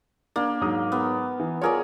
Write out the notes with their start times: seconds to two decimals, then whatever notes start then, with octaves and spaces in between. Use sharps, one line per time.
0.36 A#3 D4
0.61 G#2 F#3 D#6
0.92 B3
1.40 E3
1.62 F4 G#4 A#4 C#5 D5